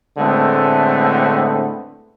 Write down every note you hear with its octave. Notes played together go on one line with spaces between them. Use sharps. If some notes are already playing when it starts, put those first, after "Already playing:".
A2 D3 G#3 A3 B3 C4